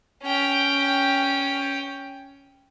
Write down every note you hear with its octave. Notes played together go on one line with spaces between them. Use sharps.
C#4 G5